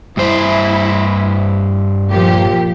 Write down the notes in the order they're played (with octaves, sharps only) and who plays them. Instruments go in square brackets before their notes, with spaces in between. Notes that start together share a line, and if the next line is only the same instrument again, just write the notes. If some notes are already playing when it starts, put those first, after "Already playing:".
[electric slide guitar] G2 C5 [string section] E4
[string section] A#2 F3 G4